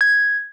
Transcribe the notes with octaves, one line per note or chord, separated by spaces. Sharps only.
G#6